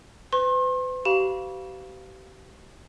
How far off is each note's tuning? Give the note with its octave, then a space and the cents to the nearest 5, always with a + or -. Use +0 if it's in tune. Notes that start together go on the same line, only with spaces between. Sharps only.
B4 +45 C6 +40
G4 -40 F5 +0 B5 -25